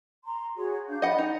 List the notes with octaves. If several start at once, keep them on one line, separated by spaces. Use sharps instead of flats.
A#5 C6
F#4 G#4 C#5
D4 F5 G6
D5 D#5 F#5 B5
D#4 D#5